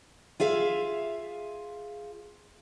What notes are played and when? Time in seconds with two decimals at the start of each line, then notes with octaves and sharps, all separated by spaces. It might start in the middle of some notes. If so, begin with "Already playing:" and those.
0.40 F4 G#4 E5 F5